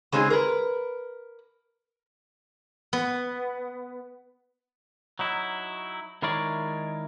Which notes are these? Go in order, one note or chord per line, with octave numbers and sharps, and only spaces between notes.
C#3 G#3 C4 D#4 G#4
A#4 B4
B3
F#3 D#4 E4
D#3 G#3 E4 A#4 C#5 D5